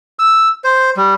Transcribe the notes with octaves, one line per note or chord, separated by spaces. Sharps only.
E6
C5
G3